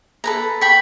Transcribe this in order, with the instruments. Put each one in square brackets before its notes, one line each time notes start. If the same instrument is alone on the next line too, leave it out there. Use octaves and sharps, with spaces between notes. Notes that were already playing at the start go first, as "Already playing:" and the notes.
[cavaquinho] A4 B4 A#5
[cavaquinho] G5 C#6 [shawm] B5